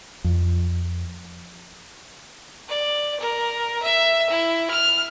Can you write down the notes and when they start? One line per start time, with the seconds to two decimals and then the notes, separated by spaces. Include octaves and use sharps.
0.24 F2
2.68 D5
3.20 A#4
3.82 E5
4.30 E4
4.70 F6